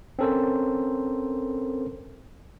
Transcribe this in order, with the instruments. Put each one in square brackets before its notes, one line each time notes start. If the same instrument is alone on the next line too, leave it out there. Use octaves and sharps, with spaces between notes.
[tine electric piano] C4 C#4 A4 A#4 C5